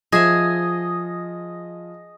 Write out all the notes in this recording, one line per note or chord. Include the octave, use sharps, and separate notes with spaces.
F3 G#4 D#5 E5